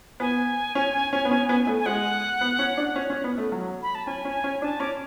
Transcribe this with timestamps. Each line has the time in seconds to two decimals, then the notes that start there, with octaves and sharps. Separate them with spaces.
0.20 B3 G#5
0.75 C#4
1.13 C#4
1.25 B3
1.31 C#4
1.49 B3
1.67 A3
1.79 G#5
1.86 G#3 F#5
2.41 B3
2.59 C#4
2.77 D4
2.96 C#4
3.10 C#4
3.24 B3
3.38 A3
3.52 F#3
3.82 B5
3.95 A5
4.06 C#4 G#5
4.25 C#4
4.44 C#4
4.62 D4 A5
4.80 C#4 D6